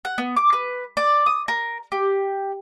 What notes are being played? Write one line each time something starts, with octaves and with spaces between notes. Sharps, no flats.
F#5
B3
D6
B4
D5
D#6
A#4
G4